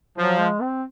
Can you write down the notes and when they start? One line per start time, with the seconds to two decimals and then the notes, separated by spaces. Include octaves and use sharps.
0.17 F3 F#3
0.40 G#3
0.61 C4